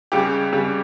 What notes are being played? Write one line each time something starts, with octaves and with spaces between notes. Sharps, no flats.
C#2 C#3 G3 G4
C#2 C#3 G3